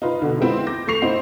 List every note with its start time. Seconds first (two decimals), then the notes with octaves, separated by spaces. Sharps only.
0.02 D#4 F4 B4
0.22 B2 D3
0.40 G#3 B3 C4 E4 F4
0.67 D6 G6 A#6
0.87 A3 C#6 C7 F7
1.02 C4 D#4 E4 C5